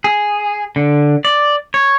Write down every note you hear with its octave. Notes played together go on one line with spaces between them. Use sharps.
G#4
D3
D5
C#5